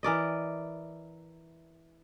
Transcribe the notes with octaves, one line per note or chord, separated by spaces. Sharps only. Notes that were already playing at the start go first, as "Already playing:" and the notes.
E3 A#4 D5 D#5